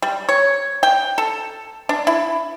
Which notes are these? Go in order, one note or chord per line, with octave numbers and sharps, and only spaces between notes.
G3
C#5
G5
A4
D4
E4